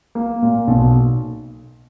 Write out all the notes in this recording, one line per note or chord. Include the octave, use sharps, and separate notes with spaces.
A#3
A#2
B1